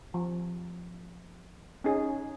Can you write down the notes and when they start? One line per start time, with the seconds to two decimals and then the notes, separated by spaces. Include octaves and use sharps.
0.14 F3
1.84 C#4 D#4 G#4